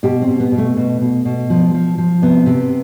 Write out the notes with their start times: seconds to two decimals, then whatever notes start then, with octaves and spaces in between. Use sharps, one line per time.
0.03 B2 G4
0.22 C4
0.28 B2
0.40 B3
0.52 B2
0.58 A3
0.77 B2
1.01 B2
1.25 B2
1.50 F3
1.74 F3
1.98 F3
2.22 C3 B3
2.46 C3